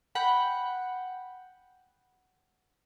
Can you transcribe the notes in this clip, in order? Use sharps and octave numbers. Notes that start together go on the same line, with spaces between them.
F#5 G5 B5